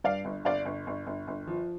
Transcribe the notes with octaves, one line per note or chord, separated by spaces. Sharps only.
G2 D5 F5
G1
G1 D5 F5
G1
G1
G1
G1
F3